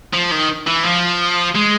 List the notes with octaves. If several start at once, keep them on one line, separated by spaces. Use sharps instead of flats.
F3
D#3
E3
F3
G#3